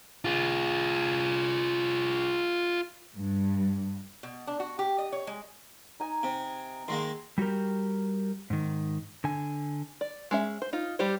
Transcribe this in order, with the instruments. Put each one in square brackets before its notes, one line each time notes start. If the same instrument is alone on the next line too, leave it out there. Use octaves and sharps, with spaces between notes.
[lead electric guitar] F4 G#4
[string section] G2
[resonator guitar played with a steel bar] B2
D4
F#4
G4
D#5
C#5
G#3
[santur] D#4 G#5
[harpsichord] C3
[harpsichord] D#3 G#3 A#3 [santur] C6 E6
[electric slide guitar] G3 F#4 G4 A#4
G#2 D#3
D3 G#5
[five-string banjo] D5
G#3 C#4 E5
C5
D#4 F4
G3 G4 C5